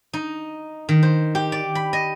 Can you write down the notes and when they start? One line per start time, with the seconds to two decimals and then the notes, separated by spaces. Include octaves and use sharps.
0.13 D#4
0.89 D#3
1.03 C5
1.35 G4
1.52 D5
1.75 B5
1.93 D#5